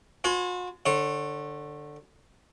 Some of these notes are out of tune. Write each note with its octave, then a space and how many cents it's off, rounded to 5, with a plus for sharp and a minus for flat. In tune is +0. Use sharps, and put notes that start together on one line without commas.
F#4 -45 C5 -25 G#5 +25
D3 +15 C#5 -20